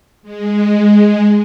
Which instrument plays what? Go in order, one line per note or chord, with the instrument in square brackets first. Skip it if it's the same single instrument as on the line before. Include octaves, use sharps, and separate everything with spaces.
[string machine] G#3